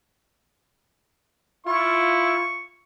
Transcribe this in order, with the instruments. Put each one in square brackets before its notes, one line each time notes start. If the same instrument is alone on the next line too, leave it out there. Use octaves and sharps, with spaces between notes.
[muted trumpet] E4 [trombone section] F4 [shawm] C#6